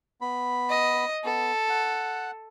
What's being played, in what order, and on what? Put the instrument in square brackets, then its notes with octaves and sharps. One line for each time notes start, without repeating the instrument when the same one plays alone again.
[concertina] B3 B5
[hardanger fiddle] D#5
[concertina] B3 [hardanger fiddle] A4
[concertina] F#5